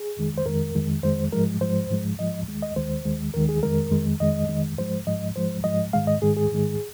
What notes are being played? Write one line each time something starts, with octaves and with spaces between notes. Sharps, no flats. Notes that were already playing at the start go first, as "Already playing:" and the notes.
Already playing: G#4
F2 D#3 G#3
C5
F2 D#3 G#3 A#4
F2 D#3 G#3
F2 D#3 G#3 C5
G#2 F3 G#3 A#4
G#2 F3 G#3 C5
G#2 F3 G#3
G#2 F3 G#3 D#5
D#2 D#3 G#3
D#5
D#2 D#3 G#3 C5
D#2 D#3 G#3
D#2 D#3 G#3 A#4
G#4
F2 D#3 G#3 A#4
F2 D#3 G#3
F2 D#3 G#3 D#5
F2 D#3 G#3
G#2 F3 G#3 C5
G#2 F3 G#3 D#5
G#2 F3 G#3 C5
G#2 F3 G#3 D#5
G#2 D#3 G#3 F5
D#5
G#2 D#3 G#3 G#4
G#4
G#2 D#3 G#3